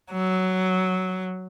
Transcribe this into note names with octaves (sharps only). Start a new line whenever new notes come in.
F#3